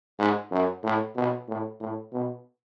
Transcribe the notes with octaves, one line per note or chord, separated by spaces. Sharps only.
G#2
F#2
A2
B2
A2
A2
B2